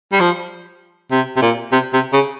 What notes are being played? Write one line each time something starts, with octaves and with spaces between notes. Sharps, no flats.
G3
F3
C3
C3
A#2
C3
C3
C#3